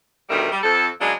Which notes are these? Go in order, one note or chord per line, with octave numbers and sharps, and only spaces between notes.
D2 B2 D#3 G3 A#4 E5
G3
F2 A4
C#3 F#3 G#3 A#3 C#4 D4